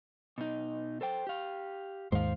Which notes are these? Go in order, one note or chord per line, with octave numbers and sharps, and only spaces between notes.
B2 D#4
A4 C5 G5
G4 F5
D#2 G#2 C5 F5